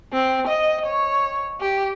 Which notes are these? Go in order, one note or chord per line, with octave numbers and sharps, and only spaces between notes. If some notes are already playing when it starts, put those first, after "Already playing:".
C4
D#5
C#5
G4